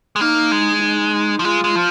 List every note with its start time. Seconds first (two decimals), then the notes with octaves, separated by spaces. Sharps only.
0.16 G#3
0.21 A#3 D#4
0.52 G#3
0.83 D#4
1.39 F3
1.44 G#3 F4
1.64 G#3
1.75 F3